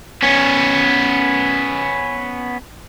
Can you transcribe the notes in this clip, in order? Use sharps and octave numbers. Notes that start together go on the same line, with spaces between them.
B3 C#4